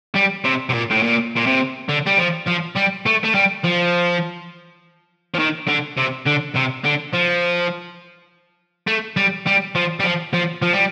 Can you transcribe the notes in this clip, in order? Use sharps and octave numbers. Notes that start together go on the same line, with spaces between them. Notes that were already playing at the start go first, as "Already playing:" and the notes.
G3
C3
C3
A#2
A2
A#2
A#2
C3
D3
G3
F3
F3
G3
A3
A3
G3
F3
F3
D#3
D3
C3
D3
C3
D3
F3
A3
G3
G3
F3
G3
F3
F3
F3
G3